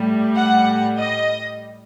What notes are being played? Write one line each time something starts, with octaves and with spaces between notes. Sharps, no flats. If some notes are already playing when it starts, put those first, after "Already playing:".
Already playing: A2 G3
F#5
D#5